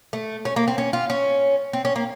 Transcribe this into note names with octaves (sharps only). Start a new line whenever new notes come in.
A3
C#4
A#3
C4
C#4
F4
C#4
C4
C#4
A#3